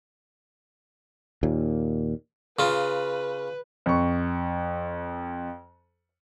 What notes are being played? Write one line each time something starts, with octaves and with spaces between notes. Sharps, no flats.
D#2 A#2
C#3 F4 B4
F2 C#6